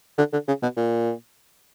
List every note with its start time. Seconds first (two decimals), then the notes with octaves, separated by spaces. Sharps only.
0.18 D3
0.33 D3
0.48 C#3
0.62 B2
0.77 A#2